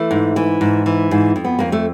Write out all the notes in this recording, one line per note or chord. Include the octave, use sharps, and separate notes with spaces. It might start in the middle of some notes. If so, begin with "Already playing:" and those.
Already playing: E3 A3
G#2
E3
G#2
E3
G#2
F2
B3
F2 A#3
A3